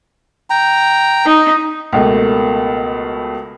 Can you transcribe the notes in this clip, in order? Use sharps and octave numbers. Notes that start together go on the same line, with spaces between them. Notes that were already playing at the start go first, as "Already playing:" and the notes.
G5 A#5
D#4
C#2 B2 A3 A#3